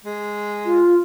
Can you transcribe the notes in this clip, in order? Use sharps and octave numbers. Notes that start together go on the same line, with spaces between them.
G#3
F4